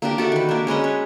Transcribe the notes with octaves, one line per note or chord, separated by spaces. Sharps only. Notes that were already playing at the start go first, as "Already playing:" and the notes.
A#3 D4 G4
F#4 A4 D5 E5
D#3 B4
A#3 D4
G#3 C#4 B4 D#5
C#5